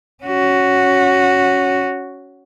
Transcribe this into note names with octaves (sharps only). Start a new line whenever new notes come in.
C#4 F#4